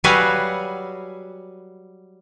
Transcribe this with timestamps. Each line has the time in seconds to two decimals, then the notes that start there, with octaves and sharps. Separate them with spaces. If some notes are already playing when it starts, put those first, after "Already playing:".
0.04 F#3 G3 F#4 B4 F5 G#5